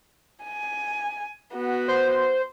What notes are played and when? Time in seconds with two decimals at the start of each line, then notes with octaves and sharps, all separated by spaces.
0.44 G#5
1.54 B3 F#4
1.88 C5